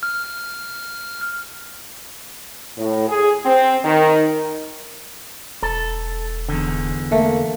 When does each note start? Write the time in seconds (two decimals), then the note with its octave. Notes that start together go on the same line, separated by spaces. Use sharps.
0.03 F6
2.78 A2
3.08 G#4
3.45 C4
3.84 D#3
5.63 E1 A4
6.49 E2 D3
7.12 A3 A#3